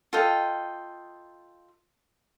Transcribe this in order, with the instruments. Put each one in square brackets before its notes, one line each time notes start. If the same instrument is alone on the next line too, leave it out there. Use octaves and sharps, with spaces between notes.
[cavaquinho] F4 A4 D#5 G5